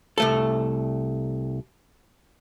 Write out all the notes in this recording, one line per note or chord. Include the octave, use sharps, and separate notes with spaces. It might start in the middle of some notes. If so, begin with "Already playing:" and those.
C2 A3 A4